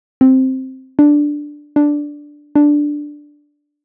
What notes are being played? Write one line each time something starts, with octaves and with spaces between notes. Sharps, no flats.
C4
D4
D4
D4